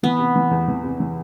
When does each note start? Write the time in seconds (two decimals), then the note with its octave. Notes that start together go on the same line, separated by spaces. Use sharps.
0.03 E3 B3
0.19 C3
0.36 E3
0.51 E2
0.68 E3
0.84 C3
1.00 E3